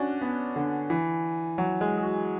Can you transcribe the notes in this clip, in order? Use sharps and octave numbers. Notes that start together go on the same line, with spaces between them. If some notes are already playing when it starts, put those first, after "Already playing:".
Already playing: C#4 D4 F#4
B3
D3
E3
F#3
G#3
G#4
F#4